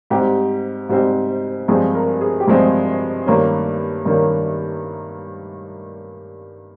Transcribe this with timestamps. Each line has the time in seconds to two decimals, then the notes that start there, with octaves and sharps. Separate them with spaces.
0.10 G#2 G3 C4 G4
0.89 G#2 G3 C4
1.68 G2 F3 G#3 C4 G#4
1.95 A#4
2.21 G#4
2.40 G4
2.47 G2 F3 G#3 C4 G#4
3.26 G2 D#3 A#3 C#4
4.06 G2 D#3 A#3 C#4